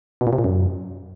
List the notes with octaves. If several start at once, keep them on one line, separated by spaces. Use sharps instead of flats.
B2
A#2
C3
A#2
F#2